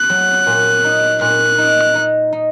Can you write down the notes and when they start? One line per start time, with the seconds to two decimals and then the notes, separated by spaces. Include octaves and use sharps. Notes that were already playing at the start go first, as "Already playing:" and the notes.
Already playing: F#6
0.10 F#3
0.46 A#2
0.84 D#4
1.21 A#2 F#6
1.58 D#4
1.95 D#4
2.32 D#4